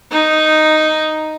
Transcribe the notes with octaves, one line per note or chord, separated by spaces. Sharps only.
D#4